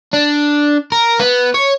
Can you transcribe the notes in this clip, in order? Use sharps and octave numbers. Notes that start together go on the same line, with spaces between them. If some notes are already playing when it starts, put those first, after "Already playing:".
D4
A#4
B3
C#5